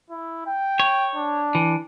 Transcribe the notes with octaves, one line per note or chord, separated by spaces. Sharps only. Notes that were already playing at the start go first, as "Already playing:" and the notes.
E4
G5
C#5
D4
E3